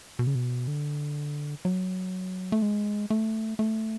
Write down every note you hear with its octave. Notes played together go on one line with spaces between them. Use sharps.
B2
C#3
B2
D3
F#3
A3
G#3
A3
A3